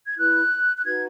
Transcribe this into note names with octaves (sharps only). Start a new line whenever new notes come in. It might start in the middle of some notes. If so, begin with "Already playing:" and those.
G#6
E4 B4 F#6
F#6
D#4 F#4 B4 G#6